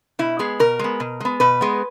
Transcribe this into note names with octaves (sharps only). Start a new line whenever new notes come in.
B2 E4
G#3 B3 G#4
B2 A#4
G#3 B3
B2
G#3 B3
B2 B4
G#3 B3